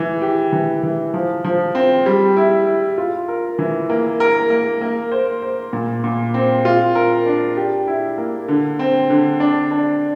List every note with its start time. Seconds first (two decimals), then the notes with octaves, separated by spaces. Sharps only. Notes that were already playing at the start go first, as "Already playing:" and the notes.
Already playing: E3
0.22 G4
0.53 E3
0.83 E3
1.14 F3
1.44 F3
1.75 C4
2.06 G3
2.37 E4
2.67 E4
2.98 F4
3.28 A#4
3.59 E3
3.90 A#3
4.20 A#4
4.50 A#3
4.81 A#3
5.12 C5
5.42 C5
5.73 A#2
6.04 A#2
6.34 C4
6.65 F4
6.95 A#4
7.26 D4
7.57 G4
7.87 E4
8.18 A#3
8.48 D3
8.79 C4
9.10 D3
9.40 D4
9.71 D4